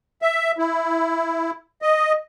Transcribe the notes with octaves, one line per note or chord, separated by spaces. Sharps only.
E5
E4
D#5